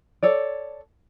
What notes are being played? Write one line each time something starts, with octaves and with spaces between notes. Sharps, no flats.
A4 C#5 D5